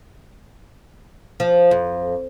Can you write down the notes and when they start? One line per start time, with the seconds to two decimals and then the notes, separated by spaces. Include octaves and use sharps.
1.40 F3
1.71 F2